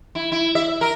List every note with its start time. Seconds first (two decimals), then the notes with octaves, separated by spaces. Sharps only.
0.15 E4
0.32 E4
0.55 E5
0.81 A#4